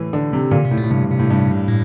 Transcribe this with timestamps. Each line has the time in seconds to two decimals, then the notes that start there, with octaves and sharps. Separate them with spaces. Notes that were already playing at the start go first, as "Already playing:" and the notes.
Already playing: A2 E3
0.13 D3
0.33 C3
0.51 A#2 D3
0.65 C3
0.71 A2
0.77 A#2
0.84 A2
0.91 G2 C3
1.10 C3
1.19 A2
1.30 G2
1.68 A2